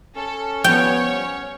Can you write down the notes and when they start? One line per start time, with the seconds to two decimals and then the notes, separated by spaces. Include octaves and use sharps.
0.16 C#4 A4
0.64 F3 G3 B3 C#5 G5